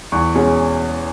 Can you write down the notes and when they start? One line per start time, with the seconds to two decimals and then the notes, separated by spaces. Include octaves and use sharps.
0.12 E2 C#6
0.35 B2 G#3 C#4